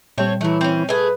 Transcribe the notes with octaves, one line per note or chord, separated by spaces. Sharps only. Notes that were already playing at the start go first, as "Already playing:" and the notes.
A#2 G3 A3 C4 C#5
E3 F#3 A3
C4 C#4
A3 G#4 B4